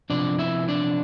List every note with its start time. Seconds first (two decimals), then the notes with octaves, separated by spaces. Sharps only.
0.10 C3 F3 B3 D4 D5
0.39 E4 E5
0.68 D4 D5